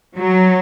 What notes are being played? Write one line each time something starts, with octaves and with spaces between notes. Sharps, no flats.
F#3